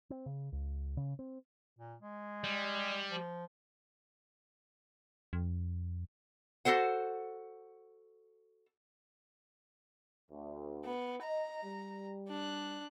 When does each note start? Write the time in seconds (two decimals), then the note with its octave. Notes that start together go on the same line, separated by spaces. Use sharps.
0.10 C4
0.26 C#3
0.52 C#2
0.97 C#3
1.19 C4
1.77 A#2
2.02 G#3
2.44 G3
3.11 F3
5.33 F2
6.65 F#4 G4 A4 C5 F#5
10.31 D2
10.84 B3
11.23 D#5 A#5
11.64 G3
12.28 D4 F#6